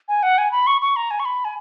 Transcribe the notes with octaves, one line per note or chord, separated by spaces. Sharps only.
G#5
F#5
G#5
B5
C#6
C#6
A#5
G#5
C#6
B5
G#5